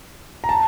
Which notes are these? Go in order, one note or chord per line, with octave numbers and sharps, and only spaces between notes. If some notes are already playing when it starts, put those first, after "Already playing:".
A#5
A5